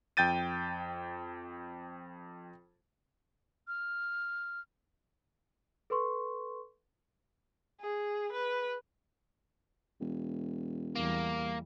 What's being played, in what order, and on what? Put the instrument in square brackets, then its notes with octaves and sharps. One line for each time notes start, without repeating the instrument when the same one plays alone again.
[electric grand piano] F2 G5 G6 A6 D#7
[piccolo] F6
[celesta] A4 B4 C6 C#6
[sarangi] G#4
B4
[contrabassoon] E1
[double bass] E2 G3 [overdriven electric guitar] A#3